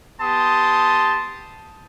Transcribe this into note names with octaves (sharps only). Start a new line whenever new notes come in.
B3 G4 A5 C6 D#6